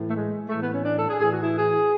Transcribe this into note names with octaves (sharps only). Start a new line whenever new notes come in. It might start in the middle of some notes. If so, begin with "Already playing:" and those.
Already playing: A2 E3
A3
G#3
A2 E3 A3
B3
C#4
D4
A4
G#4
A2 E3 G#4
F#4
E4
G#4